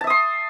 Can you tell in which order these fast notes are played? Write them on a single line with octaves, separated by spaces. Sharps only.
A5 E5 D#6 C6